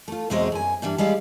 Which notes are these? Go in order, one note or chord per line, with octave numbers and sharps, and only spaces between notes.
A3 F4
E2 B2 F#3 G#3 C4 D#5
F#2 G#5
G2 E3 G3 D4
G3 G#3 D5 F5